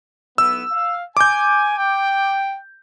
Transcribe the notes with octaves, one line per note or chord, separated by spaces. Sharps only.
B1 B3 E4 E6
F5
G#5 D6 G6
G5